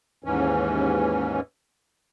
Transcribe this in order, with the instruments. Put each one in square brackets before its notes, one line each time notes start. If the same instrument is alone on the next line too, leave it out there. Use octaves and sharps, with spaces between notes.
[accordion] D#2 G#2 E3 C#4